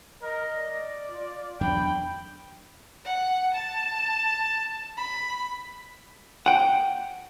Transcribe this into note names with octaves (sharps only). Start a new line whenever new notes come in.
A#4 D#5
D5
F4
E2 F#3 D4 G5 B5
F#5
A5
B5
F#5 G5